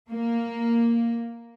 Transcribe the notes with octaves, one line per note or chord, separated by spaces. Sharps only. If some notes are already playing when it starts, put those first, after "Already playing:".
A#3